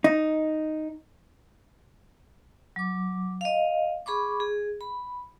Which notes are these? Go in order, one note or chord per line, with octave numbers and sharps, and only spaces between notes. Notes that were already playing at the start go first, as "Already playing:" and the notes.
D#4
F#3 D6
D#5 F5
G#4 B5 C#6 D6
G#4
B5